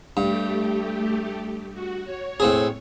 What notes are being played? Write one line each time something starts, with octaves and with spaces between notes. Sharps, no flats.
G2 A3 G4
F#4
C#5
A2 C4 G#4